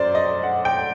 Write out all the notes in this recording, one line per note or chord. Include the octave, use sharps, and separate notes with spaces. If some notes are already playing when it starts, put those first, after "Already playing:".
Already playing: F#2 F#3 C5 D5
D#5
F#5
G5